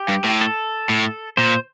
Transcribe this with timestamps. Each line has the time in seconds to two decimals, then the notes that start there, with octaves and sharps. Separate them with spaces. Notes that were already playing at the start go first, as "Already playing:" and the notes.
Already playing: G4
0.08 G2
0.24 A2
0.41 A4
0.89 A2
1.37 A#2 C5